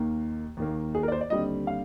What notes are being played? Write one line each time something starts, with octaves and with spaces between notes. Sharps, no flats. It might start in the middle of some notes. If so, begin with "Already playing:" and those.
Already playing: D#2 D#3 A#3
D#2 D#3 A#3
G#4
A#4
D5
C5
D5
D#2 D3 G3 C4 D#5
F5